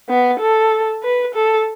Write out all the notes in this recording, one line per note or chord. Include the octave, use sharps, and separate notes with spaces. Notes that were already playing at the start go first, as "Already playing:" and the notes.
B3
A4
B4
A4